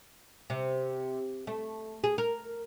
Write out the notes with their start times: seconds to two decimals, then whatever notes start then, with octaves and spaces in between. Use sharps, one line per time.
0.50 C3
1.47 A3
2.04 G#4
2.18 A#4